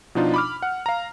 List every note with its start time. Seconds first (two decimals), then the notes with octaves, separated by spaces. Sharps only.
0.15 B2 F3 D4 D#4 F4
0.34 B5 D6 F6
0.63 F#5
0.86 F5 A#5